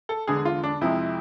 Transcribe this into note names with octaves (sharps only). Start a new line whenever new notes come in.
A4
E2 D3 G#3 G#4
F4
D4
F2 C3 F3 G#3 E4